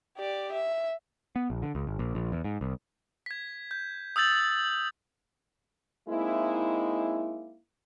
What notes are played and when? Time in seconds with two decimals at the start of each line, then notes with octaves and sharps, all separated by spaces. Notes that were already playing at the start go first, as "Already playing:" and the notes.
0.17 G4 D5
0.52 E5
1.36 B3
1.50 A#1
1.62 D3
1.75 C#2
1.87 G#1
1.99 A#1
2.15 A#1
2.32 E2
2.44 G#2
2.61 C2
3.26 G#6 B6
3.71 G6
4.16 D#6 E6 G6 A6 F#7
6.08 G#3 A#3 C4 D#4 E4